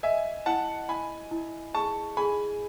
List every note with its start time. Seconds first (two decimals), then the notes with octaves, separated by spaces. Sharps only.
0.03 D#5 E5 G#5
0.46 E4 F#5 A5
0.89 E4 G#5 B5
1.31 E4
1.74 G#4 A5 C#6
2.17 G#4 G#5 B5